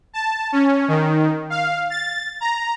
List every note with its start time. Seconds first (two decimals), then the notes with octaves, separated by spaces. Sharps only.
0.13 A5
0.52 C#4
0.88 D#3
1.50 F5
1.90 A6
2.41 A#5